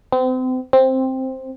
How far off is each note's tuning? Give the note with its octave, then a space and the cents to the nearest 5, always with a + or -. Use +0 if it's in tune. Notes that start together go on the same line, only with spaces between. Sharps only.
C4 -35
C4 +5